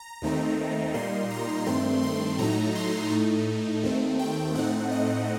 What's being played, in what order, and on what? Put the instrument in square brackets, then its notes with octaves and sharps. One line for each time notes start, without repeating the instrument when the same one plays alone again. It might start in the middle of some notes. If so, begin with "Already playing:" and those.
Already playing: [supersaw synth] A#5
D#2 D#3 A3 C4 D#4
A#2 G3 A#3 D#4 C6
A#5
G2 D#3 A3 C4 C6
C6
A2 F#3 A3 D#4 A#5
C6
A2 A3 D#4
D#2 D#3 A3 C4
G5
A2 A3 C4 D#4 F#5
D#5